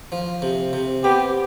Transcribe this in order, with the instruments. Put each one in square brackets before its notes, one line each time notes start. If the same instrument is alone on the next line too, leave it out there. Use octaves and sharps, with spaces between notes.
[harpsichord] F3
C3
C3
[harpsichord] B3 [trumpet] G4